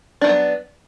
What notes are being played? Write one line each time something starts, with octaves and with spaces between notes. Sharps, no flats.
D#3 F#3 B3 D4